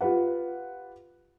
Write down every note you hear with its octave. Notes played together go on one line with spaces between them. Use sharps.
F4 G4 B4 F#5